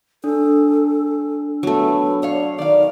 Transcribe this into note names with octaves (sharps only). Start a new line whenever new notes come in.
D4 A4
F#3 A3 B3
C#5 D5 F5
D#3 D5 F5